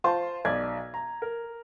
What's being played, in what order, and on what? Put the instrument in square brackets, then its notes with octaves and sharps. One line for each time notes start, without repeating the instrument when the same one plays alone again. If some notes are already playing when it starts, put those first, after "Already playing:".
[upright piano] F4 C5 A5 C6
B1 D5 G#6
A#5
A#4